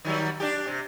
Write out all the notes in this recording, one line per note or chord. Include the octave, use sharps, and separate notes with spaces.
D#3 F#3 G3
D4 G4
C3